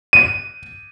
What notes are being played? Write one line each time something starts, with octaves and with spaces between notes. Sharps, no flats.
D#7